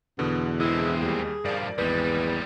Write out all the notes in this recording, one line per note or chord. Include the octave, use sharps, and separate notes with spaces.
E2 B2 D3 B3
G#3 C4 E4
D#2 G3 G#4
G2 F3 A#4 D5
G#1 E2 G3 G#3 B4